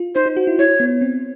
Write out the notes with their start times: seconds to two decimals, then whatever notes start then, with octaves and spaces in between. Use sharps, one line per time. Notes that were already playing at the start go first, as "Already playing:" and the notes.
Already playing: F4
0.15 D#4 C5
0.26 D#4
0.36 F#4
0.47 E4
0.59 E4 C#5
0.80 B3
1.01 C4